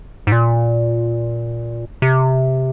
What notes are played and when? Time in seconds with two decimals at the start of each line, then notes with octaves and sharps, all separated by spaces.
0.27 G#2
0.32 A#2
2.02 C3